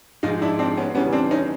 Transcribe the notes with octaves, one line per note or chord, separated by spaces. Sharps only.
G#2 F3 G#3 D#4 F4
D4 E4
C4 D4
B3 C#4
E2 C#3 E3 G3 B3 C#4
C4 D4
C#4 D#4